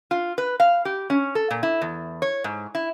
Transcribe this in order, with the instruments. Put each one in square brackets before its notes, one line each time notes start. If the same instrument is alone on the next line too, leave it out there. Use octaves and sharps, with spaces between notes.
[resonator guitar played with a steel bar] F4
B4
F5
G4
C#4
A4
A#2
E4
E2
C#5
G#2
E4